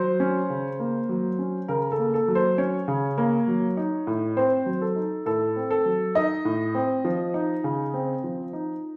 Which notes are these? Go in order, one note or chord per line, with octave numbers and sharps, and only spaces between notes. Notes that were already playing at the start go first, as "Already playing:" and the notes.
Already playing: F#3 C5
C#4
C#3
A#3
F#3
C#4
C#3 A#4
A4
A#3
A4
F#3
C5
C#4 C#5
C#3
A#3
F#3
D#4
A2
C4 C5
F#3
A4
D#4
A2 A4
C4
A4
F#3
D#4 D#5
A2
C4
F3
D#4
C#3
C4
F3
D#4